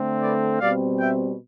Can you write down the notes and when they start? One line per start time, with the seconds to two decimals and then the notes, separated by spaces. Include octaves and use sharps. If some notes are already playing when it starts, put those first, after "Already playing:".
Already playing: D3 A3 C4
0.20 B4 D5
0.59 B2 G3 C4 D5 F5
0.98 E5 G5